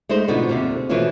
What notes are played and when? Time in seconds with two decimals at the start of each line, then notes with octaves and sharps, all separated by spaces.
0.09 G#3 A3 D#4 C5
0.28 B2 D3 F3 B3 C4 D#4
0.49 D#2 C3 A#4
0.89 B2 E3 F3 A3 C#4 F4